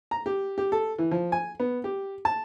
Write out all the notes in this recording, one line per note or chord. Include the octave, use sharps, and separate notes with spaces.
A#5
G4
G4
A4
E3
F3
G#5
B3
G4
A5